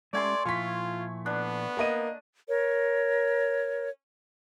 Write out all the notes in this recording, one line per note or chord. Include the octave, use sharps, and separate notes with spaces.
G#3 A3 C#4 G4 D5 G#5 C6
A#2 F3 E4 F4 C#6 B6
B3 D4
A#3 D#5 D#7
A#4 C#5